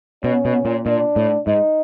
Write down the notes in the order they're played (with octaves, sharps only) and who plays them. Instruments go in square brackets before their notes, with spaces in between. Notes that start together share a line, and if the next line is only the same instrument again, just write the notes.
[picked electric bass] B2 [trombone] C#4
[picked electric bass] B2
A#2
[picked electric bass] A#2 [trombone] D4
[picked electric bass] A2
[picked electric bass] G#2 [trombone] D#4